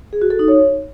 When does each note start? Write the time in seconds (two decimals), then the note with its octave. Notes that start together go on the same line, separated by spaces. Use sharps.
0.13 G#4
0.22 F#4
0.30 A4
0.39 D#4
0.48 C#5